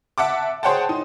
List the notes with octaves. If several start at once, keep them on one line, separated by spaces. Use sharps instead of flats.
E5 F#5 A5 D6
G#4 C5 C#5 F#5 G5 A5
D#4